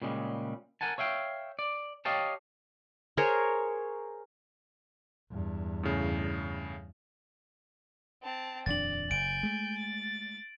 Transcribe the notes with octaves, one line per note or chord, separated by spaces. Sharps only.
A#2 C#3 G3 G#3
A#4 F#5 G#5 A5
C#5 E5 F5 G5
D5
G4 C#5 D#5 F5 G5 A5
G#4 A#4 C5 C#5
E2 G2
A2 C#3
C4 A5
D#1 F2 D4 D5 A6 F#7
F#1 G#5 G6 D7
G#3 A3
A6